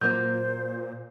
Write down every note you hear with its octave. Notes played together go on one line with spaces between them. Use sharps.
A#2 F#3 A#3 F4 C5 G6